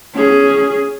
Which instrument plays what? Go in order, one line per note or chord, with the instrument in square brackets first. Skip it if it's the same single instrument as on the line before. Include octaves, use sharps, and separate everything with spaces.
[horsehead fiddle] C#4 G#4